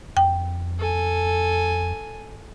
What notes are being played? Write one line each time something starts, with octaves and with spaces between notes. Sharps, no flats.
F2 G5
A4 G#5